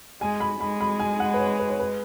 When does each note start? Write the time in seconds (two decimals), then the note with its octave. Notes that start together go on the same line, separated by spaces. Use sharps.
0.21 G#3 G#5
0.40 B5
0.60 G#3 B5
0.81 B5
1.00 G#5
1.20 F#5
1.34 B4
1.39 C#5
1.59 B4
1.70 C#5
1.79 B4